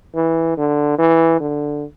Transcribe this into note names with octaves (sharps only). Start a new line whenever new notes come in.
E3
D3
E3
D3